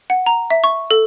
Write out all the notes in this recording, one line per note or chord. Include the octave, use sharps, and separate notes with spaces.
F#5
A#5
E5
C#6
A4